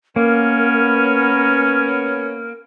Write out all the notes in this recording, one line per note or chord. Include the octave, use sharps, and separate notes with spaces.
A#3 B3 C#4 A#4